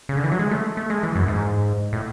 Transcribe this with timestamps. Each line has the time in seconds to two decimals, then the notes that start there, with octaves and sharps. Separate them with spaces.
0.09 C#3
0.17 D3
0.24 E3
0.32 F#3
0.39 G#3
0.51 A3
0.77 A3
0.90 G#3
1.03 E3
1.15 F#2
1.28 G#2
1.93 A2